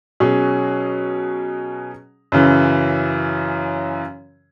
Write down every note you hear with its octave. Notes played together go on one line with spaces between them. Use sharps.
B2 F#3 C#4 G#4
F#2 C#3 E3